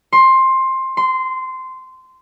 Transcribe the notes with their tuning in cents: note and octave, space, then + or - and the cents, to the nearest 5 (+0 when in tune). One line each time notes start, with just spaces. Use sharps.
C6 +15
C6 -15